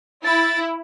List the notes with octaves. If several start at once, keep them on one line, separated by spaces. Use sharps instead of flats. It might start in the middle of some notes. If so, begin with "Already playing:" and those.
E4 A6